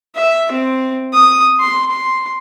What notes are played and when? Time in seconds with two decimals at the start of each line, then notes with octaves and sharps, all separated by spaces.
0.15 E5
0.52 C4
1.13 D#6
1.60 C6
1.91 C6